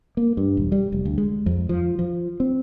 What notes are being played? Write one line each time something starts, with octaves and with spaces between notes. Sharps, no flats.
A#3
G2
E1
G3
F1
D2
G#3
F2
F3
F3
C4